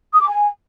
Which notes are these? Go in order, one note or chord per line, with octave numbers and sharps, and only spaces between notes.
D#6
D6
G#5